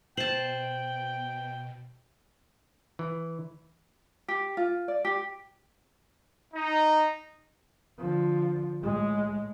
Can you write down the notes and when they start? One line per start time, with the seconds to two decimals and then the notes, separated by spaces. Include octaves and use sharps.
0.17 B2 C5 G5 A5 F#7
2.99 E3
4.28 G4
4.57 F4
4.88 D5
5.05 G4
6.53 D#4
7.98 D3 F3
8.81 A2 G#3